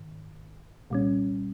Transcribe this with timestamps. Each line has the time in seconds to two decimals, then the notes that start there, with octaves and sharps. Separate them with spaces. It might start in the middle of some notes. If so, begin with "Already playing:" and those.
Already playing: G#2 D#3
0.90 C2 A#2 G3 C#4